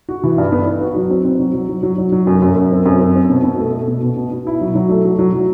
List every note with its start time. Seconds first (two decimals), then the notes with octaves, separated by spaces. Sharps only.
0.09 F#4
0.24 E3
0.38 G2
0.52 B3
0.67 B3
0.81 F#4
0.96 F#3
1.11 C4
1.25 C4
1.40 F#3
1.55 F#3
1.69 F#3
1.83 F#3
1.98 F#3
2.12 F#3
2.27 F#2
2.42 F#2
2.56 F#2
2.71 C4
2.85 F#2
3.01 C4
3.15 C4
3.30 B2
3.43 B2
3.58 A3
3.73 A3
3.88 B2
4.03 B2
4.16 B2
4.32 B2
4.47 E4
4.61 F#3
4.75 F#3
4.90 A3
5.05 F#3
5.19 F#3
5.34 F#3